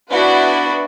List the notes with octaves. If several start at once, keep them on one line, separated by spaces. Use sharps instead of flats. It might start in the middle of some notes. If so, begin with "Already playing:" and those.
B3 D4 E4 F#4 B4